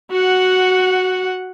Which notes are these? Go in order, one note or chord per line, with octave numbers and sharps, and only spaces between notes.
F#4 F#5